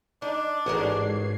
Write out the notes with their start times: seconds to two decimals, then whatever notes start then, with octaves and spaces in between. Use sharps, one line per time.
0.22 D4 D#4
0.66 A1 G#2 F#4 G#4 A#4 G#6 C7